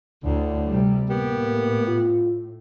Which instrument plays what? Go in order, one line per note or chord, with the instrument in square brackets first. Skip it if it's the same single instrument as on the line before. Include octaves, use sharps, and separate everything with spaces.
[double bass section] D2 [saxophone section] A2 D3
[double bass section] C3 G3
[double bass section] A2 [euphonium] A#3 [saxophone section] B3 G4
[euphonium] F4